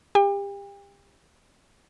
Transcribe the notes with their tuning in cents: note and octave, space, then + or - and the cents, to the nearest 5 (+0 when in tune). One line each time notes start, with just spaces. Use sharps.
G4 +30 G5 +40